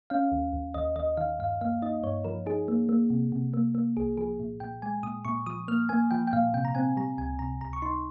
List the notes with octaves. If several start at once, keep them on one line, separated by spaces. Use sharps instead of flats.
C#4 F5
D#2
D#2
D#2 D#5
D#2 D#5
D#3 F5
G2 F5
A#3 F5
D#4 D#5
G2 C#5
F3 A#4
D#4 G#4
A#3
A#3
C3
C3
A#3
A#3
C2 G#4
F3 G#4
A#2
A#2 G5
G#3 G#5
A#2 D#6
A#2 C#6
F3 D#6
A#3 F6
A#3 G#5
F3 G5
G5
A#2 F5
C3 G5
A#5
C4 G#5
G3 A#5
C#2 G#5
C3 A#5
C#2 A#5
C#6
D#4 C6